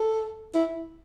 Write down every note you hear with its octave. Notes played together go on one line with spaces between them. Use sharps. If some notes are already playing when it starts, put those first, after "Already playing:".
Already playing: A4
E4